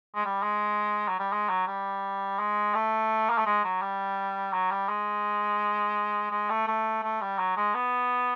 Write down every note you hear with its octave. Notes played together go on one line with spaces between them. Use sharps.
G#3
G3
G#3
F#3
G3
G#3
F#3
G3
G#3
A3
A#3
A3
G#3
F#3
G3
F#3
G3
G#3
G#3
A3
A3
A3
G3
F#3
G#3
B3